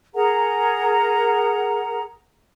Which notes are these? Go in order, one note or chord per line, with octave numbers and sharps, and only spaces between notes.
G#4 A#4 F#5 A#5